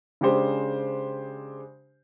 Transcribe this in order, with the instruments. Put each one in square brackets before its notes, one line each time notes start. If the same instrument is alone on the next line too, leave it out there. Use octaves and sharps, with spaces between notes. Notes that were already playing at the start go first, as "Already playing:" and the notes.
[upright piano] C#3 G#3 D4 G4 C5